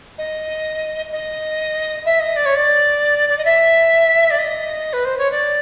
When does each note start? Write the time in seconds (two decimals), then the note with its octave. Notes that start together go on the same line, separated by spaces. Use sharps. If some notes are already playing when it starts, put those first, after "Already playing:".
0.18 D#5
1.12 D#5
2.05 E5
2.20 D#5
2.36 D5
2.45 C#5
2.55 D5
3.29 D5
3.37 D#5
3.45 E5
4.30 D5
4.38 D#5
4.93 B4
5.05 C5
5.18 C#5
5.31 D5